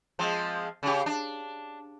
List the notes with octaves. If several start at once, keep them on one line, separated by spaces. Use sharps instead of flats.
F3 G#3 C4
C#3 G4
D4